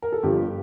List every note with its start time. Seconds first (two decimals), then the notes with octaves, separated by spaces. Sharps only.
0.02 A#4
0.12 A4
0.23 G1 G2 D3 F3 G4